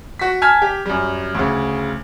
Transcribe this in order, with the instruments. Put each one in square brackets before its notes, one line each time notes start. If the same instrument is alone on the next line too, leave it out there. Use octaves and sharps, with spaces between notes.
[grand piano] F#4 B6
G#5 A5 F6 G#6 B6
G4
F#2 G3
D2 C#3